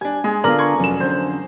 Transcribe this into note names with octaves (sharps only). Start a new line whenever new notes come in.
G3 D4 G#5
G#3 G#4
D3 B3 F4 A#4 D5 F6 A#6 F#7
C6 C#6 G#6
F1 F2 F#3 C#4 E7
D3 C5